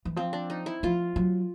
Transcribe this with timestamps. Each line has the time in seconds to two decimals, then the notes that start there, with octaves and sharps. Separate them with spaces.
0.05 E3
0.16 F3 C4
0.33 D4
0.50 D#4
0.66 E4
0.83 F3 F4
1.16 F#3